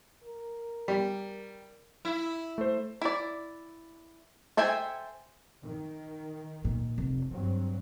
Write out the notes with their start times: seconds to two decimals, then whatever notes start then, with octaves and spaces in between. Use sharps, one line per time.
0.24 A#4
0.88 G3
2.05 E4
2.58 A3 C5
3.02 E4 D5
4.57 A4 C5 E5 G5 G#5
5.64 D#3
6.65 A#2
6.98 F1
7.31 G2 D#3 F#3 C4